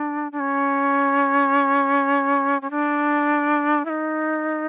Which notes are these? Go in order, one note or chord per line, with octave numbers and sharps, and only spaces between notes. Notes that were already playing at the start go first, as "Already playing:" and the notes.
Already playing: D4
D4
C#4
C#4
D4
E4
D#4